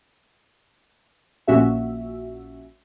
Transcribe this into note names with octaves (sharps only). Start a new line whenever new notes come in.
A#1 A#2 C#4 F#4 E5